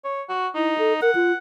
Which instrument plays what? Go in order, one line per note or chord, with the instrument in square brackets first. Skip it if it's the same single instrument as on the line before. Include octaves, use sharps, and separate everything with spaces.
[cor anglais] C#5
F#4
[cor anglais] D#4 [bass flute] E4
[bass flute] A4
[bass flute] A#4 [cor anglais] F#5
[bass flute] F4